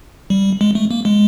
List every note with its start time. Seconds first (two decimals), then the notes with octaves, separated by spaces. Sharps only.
0.30 G3
0.61 G#3
0.75 A3
0.91 A#3
1.05 G#3